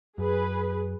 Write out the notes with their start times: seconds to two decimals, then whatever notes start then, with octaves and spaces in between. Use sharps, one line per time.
0.18 F#2 G#4 B4